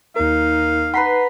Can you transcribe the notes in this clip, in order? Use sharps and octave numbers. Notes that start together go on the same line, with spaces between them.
D#2 D#4 A#4 F5
B4 F#5 A#5 C6 B6 C7